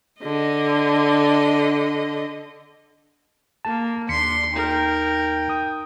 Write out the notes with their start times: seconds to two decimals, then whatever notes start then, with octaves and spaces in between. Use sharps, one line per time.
0.22 D3 D#5
3.65 A#3 A5
4.09 D#2 D4 C6 B6 C#7
4.53 D#4 A#4 G5
5.49 D#6